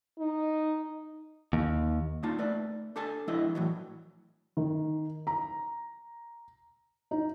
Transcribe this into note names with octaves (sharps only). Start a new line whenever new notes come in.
D#4
D#2
A#3 D#4 F4 A5
A3 B4 D5
D4 G4 A4 G#5 A5
F3 G#3 D4 E4 B4 D#5
A2 E3 F#3
D#3
A#5
D#4